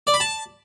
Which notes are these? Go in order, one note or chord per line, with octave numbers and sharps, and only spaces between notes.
D5
B5
A5